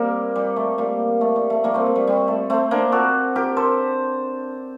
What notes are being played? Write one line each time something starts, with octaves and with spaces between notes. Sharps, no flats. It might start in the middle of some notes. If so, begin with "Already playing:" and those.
Already playing: G3 A#3 C4
G3
A3
G3 A#3
A3
G3
A3
G3 A#3
A3 C4
A3
G3
G3
A3
A3 C4
A#3 D4
F#4 A4
G4 A#4
A4 C5